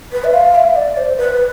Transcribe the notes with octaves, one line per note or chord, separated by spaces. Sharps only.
B4
E5
F5
E5
D5
C5
B4